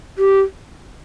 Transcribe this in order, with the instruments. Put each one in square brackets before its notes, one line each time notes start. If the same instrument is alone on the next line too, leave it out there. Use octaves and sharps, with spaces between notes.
[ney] G4